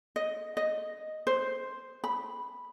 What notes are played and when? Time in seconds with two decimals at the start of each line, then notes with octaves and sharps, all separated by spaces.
0.16 D#5
0.57 D#5
1.27 C5
2.04 B5